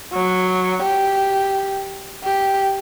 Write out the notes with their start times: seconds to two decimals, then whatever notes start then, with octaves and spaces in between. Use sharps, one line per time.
0.13 F#3
0.83 G4
2.24 G4